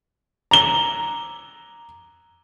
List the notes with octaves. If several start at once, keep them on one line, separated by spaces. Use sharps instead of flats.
A#5 G7